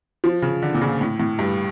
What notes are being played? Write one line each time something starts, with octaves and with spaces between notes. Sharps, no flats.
F3
C#3
D3
A#2
C#3
A2
A2
G2